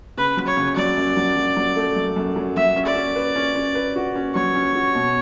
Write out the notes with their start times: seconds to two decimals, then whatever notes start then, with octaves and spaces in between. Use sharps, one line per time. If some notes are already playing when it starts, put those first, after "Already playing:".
0.17 C#3 B4
0.37 F#3
0.47 C#5
0.57 C#3
0.76 F#3 D5
0.97 F#2
1.17 F#3
1.36 F#3
1.57 F#3
1.76 A3
1.96 F#2
2.16 F#2
2.36 F#3
2.56 F#3 E5
2.76 C#4
2.86 D5
2.96 C#4
3.16 B4
3.36 C#4
3.56 C#4
3.75 B4
3.96 F#4
4.16 C#4
4.35 F#3 C#5
4.55 C#4
4.75 F#4
4.95 B2